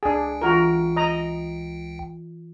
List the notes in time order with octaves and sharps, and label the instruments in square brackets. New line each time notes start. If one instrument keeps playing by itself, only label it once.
[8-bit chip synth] C#2 G5 [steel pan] D4 G#4
[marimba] E3 F4 [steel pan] F#4 A#4
[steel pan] D#5 A#5